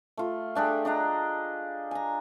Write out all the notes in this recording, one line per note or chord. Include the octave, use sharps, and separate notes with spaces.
A3 F4
A3 D4 G4 G#4
D4 D#5 A#5
G#5 A#5